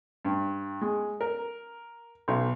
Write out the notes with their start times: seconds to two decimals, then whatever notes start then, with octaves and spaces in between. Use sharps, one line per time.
0.25 G2
0.81 G#3
1.21 A#4
2.28 B1